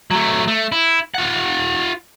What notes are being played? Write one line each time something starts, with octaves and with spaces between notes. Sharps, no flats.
F#3 A3
A3
E4
F4 F#5